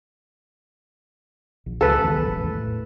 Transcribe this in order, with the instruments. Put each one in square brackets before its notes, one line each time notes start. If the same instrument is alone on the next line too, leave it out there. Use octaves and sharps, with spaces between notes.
[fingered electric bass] A#1
[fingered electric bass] C#2 [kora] A4 B4
[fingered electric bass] B1 E2 D#3
E1 A1
A2